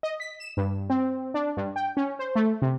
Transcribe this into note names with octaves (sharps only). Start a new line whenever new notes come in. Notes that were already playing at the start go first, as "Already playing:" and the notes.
D#5
B6
E7
G2
C4
D4
G2
G5
C#4
C5
A3
C3